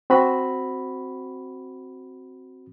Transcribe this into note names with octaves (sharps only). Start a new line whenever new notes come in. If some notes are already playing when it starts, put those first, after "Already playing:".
C4 F#4 B5